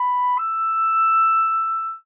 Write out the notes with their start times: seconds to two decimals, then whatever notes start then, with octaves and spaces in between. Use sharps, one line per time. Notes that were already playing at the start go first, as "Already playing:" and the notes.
Already playing: B5
0.38 E6